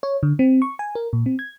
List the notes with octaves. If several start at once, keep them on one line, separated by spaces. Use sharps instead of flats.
C#5
D3
C4
C#6
G#5
A#4
A#2
C4
G#6